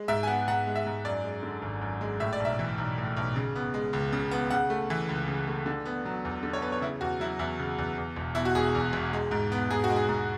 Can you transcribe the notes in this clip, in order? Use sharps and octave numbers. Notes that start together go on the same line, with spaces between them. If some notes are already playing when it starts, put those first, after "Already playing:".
Already playing: G#3
G#2 E5
G#5
B3 F#5
G#2 F#5
G#3
E5
G#2
F#2 D5
G#3
D3
G#1
F#2
G#3
A2 E5
D5
B1
E5
E3
B1
A2
B1
C#3
B3
G#3
C#2
C#3
B3
C#3 F#5
A3
E3
C#2
C#3
A3
D3
B3
F#3
E2
D3
C#5
B3 B4
C#5
C#3 E4
E2 F#4
F#3 E4
E2 E4
C#3
E2
E2
E1
B2 E4
F#4
E1 G#4
E2
E1
G#3
G#2
B3
G#2 G#4
F#4
G#3
G#4
G#2